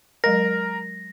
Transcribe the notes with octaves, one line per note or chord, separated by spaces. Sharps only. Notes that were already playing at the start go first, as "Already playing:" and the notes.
F#3 G#3 A#4 D#5 A#6